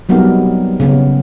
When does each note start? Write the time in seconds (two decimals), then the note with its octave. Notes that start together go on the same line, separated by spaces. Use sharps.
0.09 F#3 G3 B3 C4 D#4 A#4
0.80 C#3 B3 C#4